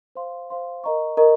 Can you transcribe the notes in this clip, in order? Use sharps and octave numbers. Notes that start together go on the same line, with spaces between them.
C5 F5 C6
C5 F5 C6
A#4 D#5 A#5 C#6
A#4 D#5 A#5 C#6